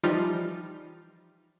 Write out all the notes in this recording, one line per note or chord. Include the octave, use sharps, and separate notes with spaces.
E3 F3 G3 D#4 F4